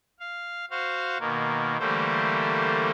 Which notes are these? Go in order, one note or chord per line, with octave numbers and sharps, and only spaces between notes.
F5
F#4 C5 F5
B2 D#3 A#3
D3 E3 G3 A3 A#3 C5